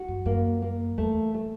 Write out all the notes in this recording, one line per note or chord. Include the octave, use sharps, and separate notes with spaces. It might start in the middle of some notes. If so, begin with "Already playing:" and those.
Already playing: F#4
F#2
F#2 A#3
A#3
E2 A3
A3